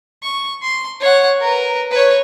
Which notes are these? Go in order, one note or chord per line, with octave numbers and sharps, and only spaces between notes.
C#6
C6
C#5 F#5
A#4 B4
B4 C#5